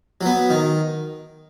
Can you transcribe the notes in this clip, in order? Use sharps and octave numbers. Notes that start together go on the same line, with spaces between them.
F#3 B3
D#3